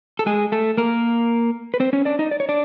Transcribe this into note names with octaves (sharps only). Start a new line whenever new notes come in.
A4
G#3 G#4
A3 A4
A#3 A#4
B4
C4 C5
C#4 C#5
D4 D5
D#4 D#5
D5
C#5
D4 D5